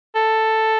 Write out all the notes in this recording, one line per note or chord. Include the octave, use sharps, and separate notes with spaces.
A4